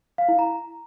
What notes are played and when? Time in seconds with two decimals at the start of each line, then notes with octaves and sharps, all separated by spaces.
0.18 F5
0.29 E4
0.39 A#5